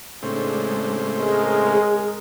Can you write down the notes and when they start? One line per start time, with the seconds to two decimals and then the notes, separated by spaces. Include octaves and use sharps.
0.23 A2 C#3 G#3 C4 D4
1.17 G#3 G#4 A#4